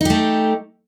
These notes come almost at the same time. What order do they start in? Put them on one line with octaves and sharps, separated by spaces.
D#4 G4 A3